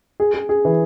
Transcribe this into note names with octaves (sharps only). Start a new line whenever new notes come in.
G#4
G#4
G#4
E3